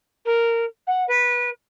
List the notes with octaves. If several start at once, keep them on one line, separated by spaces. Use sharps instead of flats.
A#4
F#5
B4